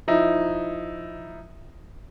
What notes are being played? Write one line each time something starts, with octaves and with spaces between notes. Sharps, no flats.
F3 D#4 E4